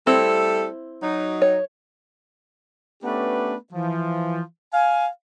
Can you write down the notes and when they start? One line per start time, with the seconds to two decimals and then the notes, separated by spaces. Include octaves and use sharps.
0.07 G3 A3 C4 E4 A4
1.02 F#3 D#4
1.42 C#5
3.04 A3 B3 C#4 D4 G4 B4
3.73 E3 F3
4.73 F5 G#5